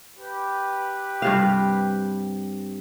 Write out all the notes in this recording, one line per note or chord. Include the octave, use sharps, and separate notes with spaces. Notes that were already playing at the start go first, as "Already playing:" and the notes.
G4 B4
G2 C3 F5